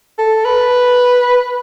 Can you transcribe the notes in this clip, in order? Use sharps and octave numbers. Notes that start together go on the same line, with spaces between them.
A4
B4